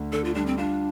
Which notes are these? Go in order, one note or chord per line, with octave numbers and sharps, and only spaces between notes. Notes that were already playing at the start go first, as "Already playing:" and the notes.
Already playing: D2 D3
D3 A4
F4
G3 D4
C4
D4 F4